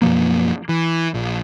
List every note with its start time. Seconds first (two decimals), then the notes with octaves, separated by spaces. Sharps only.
0.02 F#2 B2 F3 A#3
0.69 E3
1.14 A#1